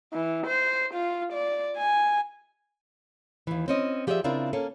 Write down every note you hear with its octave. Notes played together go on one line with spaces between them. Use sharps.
E3
C5
F4
D5
G#5
D#2 E3
C4 C#4 D#5
F3 G4 G#4 C#5 D5 E5
C#3 C4 D4 E4 F4 A#4
A#3 C#4 A4